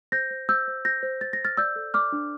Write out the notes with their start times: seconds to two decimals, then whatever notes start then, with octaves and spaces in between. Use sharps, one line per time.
0.12 C5 G6 A#6
0.31 C5
0.49 C5 E6 G6
0.67 C5
0.85 C5 G6 A#6
1.03 C5
1.21 C5 A6
1.33 A#6
1.39 C5
1.45 F6 A6
1.57 D5 E6 G6
1.76 A4
1.94 D5 D6 F6
2.12 D4